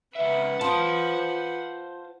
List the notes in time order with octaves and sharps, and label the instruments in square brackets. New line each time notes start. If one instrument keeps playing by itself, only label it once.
[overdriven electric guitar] C#2 E5 [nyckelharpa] B4 F#5
[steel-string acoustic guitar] F4 [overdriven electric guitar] C5 A5